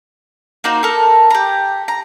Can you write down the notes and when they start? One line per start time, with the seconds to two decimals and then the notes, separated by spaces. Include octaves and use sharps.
0.64 A#3 D#4 F#4 C5
0.83 A4 A#4
1.31 G4 A#5
1.88 A#5